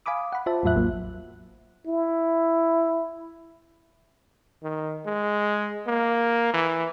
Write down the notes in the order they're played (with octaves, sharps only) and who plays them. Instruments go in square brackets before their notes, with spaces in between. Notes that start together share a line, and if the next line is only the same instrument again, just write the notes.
[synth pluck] F5 G#5 B5 D6 D#6
F#5 B5
F4 C5 E5 A5
E2 A2 F#3 F4 E5 F#6
A1 F#3 A#3
[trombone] E4
D#3
G#3
A#3
E3